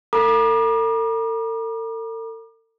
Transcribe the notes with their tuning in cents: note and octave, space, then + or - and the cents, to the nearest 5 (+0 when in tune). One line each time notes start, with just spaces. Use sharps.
A4 +45 A#5 +45 D6 +35